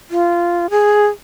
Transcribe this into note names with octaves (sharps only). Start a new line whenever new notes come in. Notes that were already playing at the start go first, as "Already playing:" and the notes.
F4
G#4